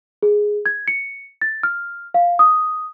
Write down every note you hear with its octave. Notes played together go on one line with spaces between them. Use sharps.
G#4
G#6
C#7
A6
F6
F5
D#6